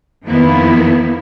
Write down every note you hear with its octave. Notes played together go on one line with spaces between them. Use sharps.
F2 D#3 F3 A#3 B3 E4